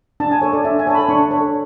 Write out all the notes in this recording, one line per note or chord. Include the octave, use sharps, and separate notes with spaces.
D4 A5
G#5
A4 C#5
D5
D4 E5
G#5
A4 C#5 A5
B5
D4 C#6
A4 C#5